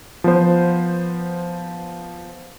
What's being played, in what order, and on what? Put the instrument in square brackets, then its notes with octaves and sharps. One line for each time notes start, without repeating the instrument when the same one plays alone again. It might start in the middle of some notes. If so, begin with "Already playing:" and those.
[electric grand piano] F3 B3 C5